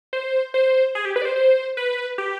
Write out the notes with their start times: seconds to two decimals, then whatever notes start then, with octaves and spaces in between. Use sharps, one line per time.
0.13 C5
0.54 C5
0.95 G#4
1.05 G4
1.16 B4
1.22 D5
1.25 C5
1.36 C5
1.77 B4
2.18 G4